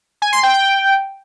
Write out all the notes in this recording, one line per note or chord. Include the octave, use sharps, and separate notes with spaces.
G#5
C6
G5
G5